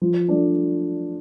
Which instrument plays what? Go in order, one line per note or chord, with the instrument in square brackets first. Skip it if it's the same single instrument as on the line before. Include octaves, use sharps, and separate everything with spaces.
[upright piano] F3
A3 D4